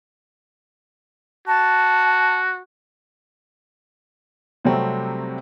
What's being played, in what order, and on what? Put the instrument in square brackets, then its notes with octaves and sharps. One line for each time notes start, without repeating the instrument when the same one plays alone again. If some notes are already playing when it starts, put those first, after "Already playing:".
[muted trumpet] F#4 [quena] A5
[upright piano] C3 F#3 G3 A3 C4